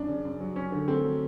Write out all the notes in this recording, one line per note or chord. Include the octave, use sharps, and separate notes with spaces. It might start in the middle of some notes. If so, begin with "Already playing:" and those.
Already playing: F#2 D4
C#3
F#2
F#3
F#2 C#4
D3
A3 C4
F#3